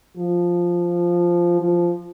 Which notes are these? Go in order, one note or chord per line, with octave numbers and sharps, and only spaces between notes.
F3
F3